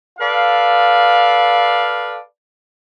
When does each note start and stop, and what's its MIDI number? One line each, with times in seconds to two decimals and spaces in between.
0.19 2.20 69
0.19 2.20 71
0.19 2.20 74
0.19 2.20 77